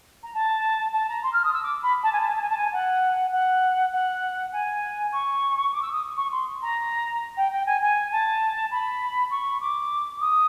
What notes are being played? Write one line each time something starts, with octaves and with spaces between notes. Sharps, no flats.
A#5
A5
A5
A#5
C6
F6
D#6
E6
D6
B5
A5
G#5
A5
G#5
A5
G#5
A5
G#5
F#5
F#5
F#5
G#5
C#6
D6
E6
D#6
C#6
C6
A#5
G5
G5
G#5
G#5
A5
B5
C#6
D6
D#6